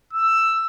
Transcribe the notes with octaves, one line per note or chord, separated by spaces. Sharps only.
E6